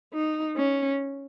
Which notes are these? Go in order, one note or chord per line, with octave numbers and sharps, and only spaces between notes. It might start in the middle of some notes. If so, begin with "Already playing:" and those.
D#4
C#4